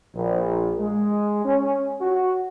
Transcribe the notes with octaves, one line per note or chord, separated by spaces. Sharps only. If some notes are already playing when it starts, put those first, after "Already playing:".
A#1
G#3
C#4
F#4